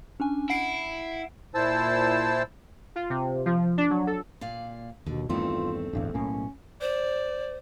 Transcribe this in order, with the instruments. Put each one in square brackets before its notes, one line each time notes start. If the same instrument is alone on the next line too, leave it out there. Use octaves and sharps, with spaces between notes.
[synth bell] C#4 D4 G#5
[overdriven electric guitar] E4 [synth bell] F#5 C7 D7
[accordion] A#2 E4 C5 A5 E6
[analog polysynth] F4
C3
F3
D4
F#3
A4
[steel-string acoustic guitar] A#2 D5 F5
[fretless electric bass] D#2 [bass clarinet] B2 [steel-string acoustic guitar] D3
[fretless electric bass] E2 G2 D#3 [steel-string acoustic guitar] A3 C4 [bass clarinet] F4
[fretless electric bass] D1 A1 E2 [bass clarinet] G2
[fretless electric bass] B1 A2 A#3 [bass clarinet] C#4
[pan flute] C5 [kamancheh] D5